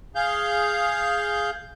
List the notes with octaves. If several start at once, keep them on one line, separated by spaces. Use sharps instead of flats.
G#4 F5 G6